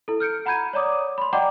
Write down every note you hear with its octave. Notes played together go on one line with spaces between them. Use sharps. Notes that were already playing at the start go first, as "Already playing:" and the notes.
E4 A4
F6 G6 C#7 D7
F#5 A#5 B5 G6 G#6 D#7
C#5 D5 A#5 D6 D#6
B5 C6
D5 D#5 F#5 G5 A#5 D6